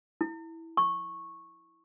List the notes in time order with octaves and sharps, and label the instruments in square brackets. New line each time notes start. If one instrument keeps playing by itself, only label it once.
[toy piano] E4
C#6